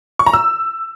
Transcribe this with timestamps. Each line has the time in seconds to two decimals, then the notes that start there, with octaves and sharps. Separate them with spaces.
0.19 C#6
0.26 A#5
0.33 E6